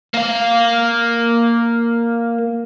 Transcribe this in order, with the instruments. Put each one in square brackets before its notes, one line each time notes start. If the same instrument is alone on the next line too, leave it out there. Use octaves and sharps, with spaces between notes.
[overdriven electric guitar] A#3 F5